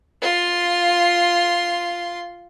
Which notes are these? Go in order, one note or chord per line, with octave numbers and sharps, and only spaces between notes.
F4 C6